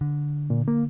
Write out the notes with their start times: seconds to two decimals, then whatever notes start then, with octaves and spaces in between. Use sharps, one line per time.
0.01 D3
0.50 A#2
0.68 A#3